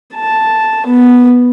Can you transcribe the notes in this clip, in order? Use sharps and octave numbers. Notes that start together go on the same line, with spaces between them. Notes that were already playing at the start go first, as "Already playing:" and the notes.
A5
B3